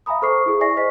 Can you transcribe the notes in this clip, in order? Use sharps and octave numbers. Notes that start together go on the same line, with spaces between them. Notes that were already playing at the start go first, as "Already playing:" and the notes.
E5 F5 G#5 A#5 B5 D#6
A4 C5 C#6 D6 C7
E4 G#4
D5 E5 G#5 C#6 A#6 C7
C5 D#5 B6